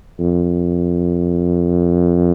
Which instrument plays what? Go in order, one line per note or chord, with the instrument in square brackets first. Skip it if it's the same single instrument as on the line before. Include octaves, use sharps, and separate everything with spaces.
[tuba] F2